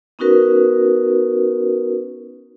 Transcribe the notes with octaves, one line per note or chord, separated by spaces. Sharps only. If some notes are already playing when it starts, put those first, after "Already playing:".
B3 C#4 D#4 F#4 A#4 B4